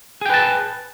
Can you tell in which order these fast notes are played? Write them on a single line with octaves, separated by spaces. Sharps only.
G#4 G5 B4 A5